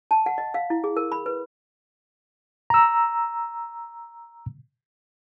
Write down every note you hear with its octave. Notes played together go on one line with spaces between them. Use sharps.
A5
F#5
D#5
F5
E4
G#4
A#4
B5
B4
A#5 E6